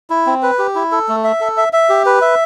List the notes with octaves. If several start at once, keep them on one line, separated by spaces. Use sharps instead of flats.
E4
C4
B4
G4
E4
A4
A3
E5
A4
E5
E5
G4
B4
E5